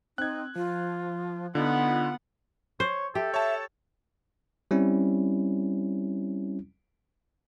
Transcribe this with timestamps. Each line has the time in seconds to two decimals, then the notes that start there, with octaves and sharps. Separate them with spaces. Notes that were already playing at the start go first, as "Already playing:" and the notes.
0.18 C4 D#4 F#6 G#6
0.55 F3 F4
1.55 D3 B3 D#4 F4 F#5
2.80 C5 C#5
3.15 G4 A4 E5
3.34 C#5 E5 A5
4.71 G3 C4 C#4 E4